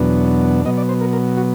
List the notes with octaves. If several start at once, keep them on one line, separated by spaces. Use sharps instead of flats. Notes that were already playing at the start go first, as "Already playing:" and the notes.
Already playing: E2 B2 F#3 B3 D4
B2 F#3 B3 D#5
D5
C5
A#4
A#4
F#4